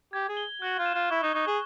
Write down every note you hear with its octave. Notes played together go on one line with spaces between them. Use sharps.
G4 G#6
G#4
G7
F#4 F#6
F4
E7
F4
E4 C#6
D#4
D#4 C#6
G#4